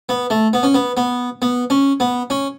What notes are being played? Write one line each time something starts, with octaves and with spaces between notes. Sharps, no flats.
B3
A3
B3
C#4
B3
B3
B3
C#4
B3
C#4